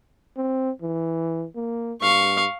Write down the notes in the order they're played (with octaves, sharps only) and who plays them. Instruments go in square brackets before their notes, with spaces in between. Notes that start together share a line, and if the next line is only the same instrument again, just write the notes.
[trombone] C4
E3
A#3
[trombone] G2 [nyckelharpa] F5 C#6